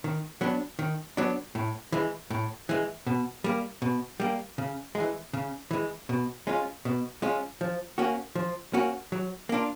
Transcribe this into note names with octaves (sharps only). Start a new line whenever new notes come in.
D#3
F#3 B3 D4
D#3
F#3 B3 D4
A2
E3 G#3
A2
E3 G#3
B2
G3 A#3
B2
G3 A#3
C#3
G#3
E3
C#3
E3 G#3
B2
G#3 C#4 F4
B2
G#3 C#4 F4
F3
A#3 C#4 F#4
F3
A#3 C#4 F#4
F#3
A#3 D4 F4